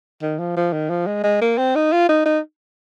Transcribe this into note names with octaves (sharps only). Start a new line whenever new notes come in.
D#3
F3
F3
D#3
F3
G#3
G#3
A#3
C4
D#4
F4
D#4
D#4